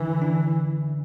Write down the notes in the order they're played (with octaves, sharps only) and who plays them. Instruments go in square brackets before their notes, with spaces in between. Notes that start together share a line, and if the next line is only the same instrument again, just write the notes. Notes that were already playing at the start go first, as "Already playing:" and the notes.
Already playing: [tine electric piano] D3 D4 [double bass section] E3
[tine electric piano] D4